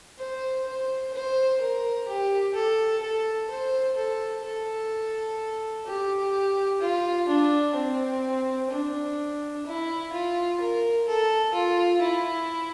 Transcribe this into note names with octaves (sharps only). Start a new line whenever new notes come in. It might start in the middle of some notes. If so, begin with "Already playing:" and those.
C5
C5
C5
A#4
G4
A4
A4
C5
A4
A4
G4
F4
D4
C4
D4
E4
F4
A#4
A4
F4
E4